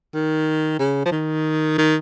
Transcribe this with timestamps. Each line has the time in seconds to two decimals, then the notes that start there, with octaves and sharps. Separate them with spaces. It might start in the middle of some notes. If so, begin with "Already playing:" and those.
0.14 D#3
0.79 C#3
1.05 F3
1.12 D#3
1.78 D#3